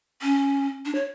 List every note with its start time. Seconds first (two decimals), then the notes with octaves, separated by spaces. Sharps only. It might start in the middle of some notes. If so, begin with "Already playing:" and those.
0.22 C#4
0.85 D4
0.95 C#5